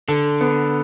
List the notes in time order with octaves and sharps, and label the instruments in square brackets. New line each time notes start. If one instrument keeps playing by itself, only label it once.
[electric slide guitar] D3 [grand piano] A4
[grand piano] B3